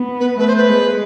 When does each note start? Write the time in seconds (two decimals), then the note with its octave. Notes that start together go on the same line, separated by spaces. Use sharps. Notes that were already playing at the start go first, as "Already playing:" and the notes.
Already playing: B3
0.20 B4
0.39 A3 B4
0.47 C5
0.56 B4
0.68 G#3